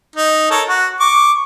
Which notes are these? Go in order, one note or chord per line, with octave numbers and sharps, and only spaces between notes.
D#4
A4 A#4 C#5
F#4
C#6 D6